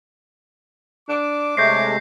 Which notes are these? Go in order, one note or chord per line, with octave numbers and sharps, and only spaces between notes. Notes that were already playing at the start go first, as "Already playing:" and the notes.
D4 D6
C3 G#3 A3 C#5 G6 A#6 C7